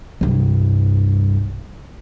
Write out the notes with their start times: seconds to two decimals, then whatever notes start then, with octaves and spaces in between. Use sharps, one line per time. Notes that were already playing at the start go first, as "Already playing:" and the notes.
0.21 C2 G2